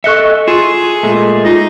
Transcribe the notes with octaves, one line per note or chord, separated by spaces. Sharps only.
A4 D#5 E5 C#6 F#6 C#7
F4 G#4 D#7 E7
A#2 G#3 A3
D#4 F4